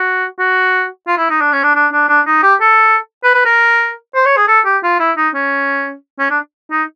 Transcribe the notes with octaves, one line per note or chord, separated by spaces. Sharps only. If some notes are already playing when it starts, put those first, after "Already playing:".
Already playing: F#4
F#4
F4
E4
D#4
D4
C#4
D4
D4
D4
D4
D#4
G4
A4
B4
B4
A#4
C5
C#5
G#4
A4
G4
F4
E4
D#4
C#4
C#4
D4
D#4